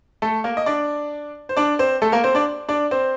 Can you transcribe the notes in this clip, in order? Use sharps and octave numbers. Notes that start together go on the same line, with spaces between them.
A3 A4
A#3 A#4
D#5
D4 D5
C5
D4 D5
C4 C5
A3 A4
A#3 A#4
C4 C5
D4 D5
D4 D5
C4 C5